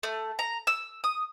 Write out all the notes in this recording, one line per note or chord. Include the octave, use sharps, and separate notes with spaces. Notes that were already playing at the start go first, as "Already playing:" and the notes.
A3
A#5
E6
D#6